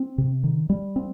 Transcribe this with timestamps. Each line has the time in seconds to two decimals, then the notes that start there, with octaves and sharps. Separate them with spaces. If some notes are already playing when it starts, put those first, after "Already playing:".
Already playing: C4
0.18 C3
0.44 D#3
0.70 G3
0.96 C4